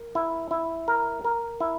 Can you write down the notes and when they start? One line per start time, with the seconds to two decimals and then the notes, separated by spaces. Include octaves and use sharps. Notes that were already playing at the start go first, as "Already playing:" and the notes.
Already playing: A#4
0.15 E4
0.51 E4
0.88 A#4
1.24 A#4
1.60 E4